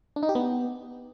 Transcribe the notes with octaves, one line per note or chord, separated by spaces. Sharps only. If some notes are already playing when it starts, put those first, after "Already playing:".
D4
D#4
G4
B3